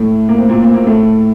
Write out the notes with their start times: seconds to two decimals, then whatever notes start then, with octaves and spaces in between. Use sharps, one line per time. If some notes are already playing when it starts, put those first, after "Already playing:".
Already playing: A2 A3
0.29 A#3
0.38 C4
0.49 A#2 A#3
0.63 C4
0.74 A#3
0.86 A2 A3